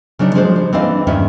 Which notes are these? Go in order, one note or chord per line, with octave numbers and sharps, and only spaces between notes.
C#3 F#3 D4 D#4
F3 G#3 D4 F#4 G#4 C5
G3
E3 C4 D4 D#4 D#5 F5
E2 G2 D#3 C#4 D#4 E5